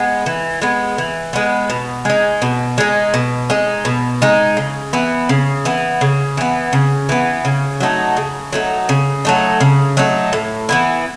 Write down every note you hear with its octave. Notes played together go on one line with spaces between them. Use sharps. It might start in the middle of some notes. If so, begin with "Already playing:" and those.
Already playing: G#3 B3
E3
G#3 B3
E3
G#3 B3
B2
G#3 D#4
B2
G#3 D#4
B2
G#3 D#4
B2
G#3 D#4
C#3
E3 B3
C#3
E3 B3
C#3
E3 B3
C#3
E3 B3
C#3
F#3 A3 D#4
C#3
F#3 A3 D#4
C#3
F#3 A3 D#4
C#3
F#3 A3 D#4
A2
E3 B3 E4